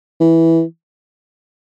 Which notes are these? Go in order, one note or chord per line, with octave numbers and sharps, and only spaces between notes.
E3